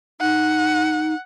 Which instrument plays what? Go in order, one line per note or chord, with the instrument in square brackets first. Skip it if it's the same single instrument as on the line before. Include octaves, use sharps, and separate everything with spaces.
[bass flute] D#4 [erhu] F#5